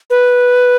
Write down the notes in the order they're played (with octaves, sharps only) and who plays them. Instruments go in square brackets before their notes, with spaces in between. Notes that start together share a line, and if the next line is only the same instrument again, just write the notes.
[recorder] B4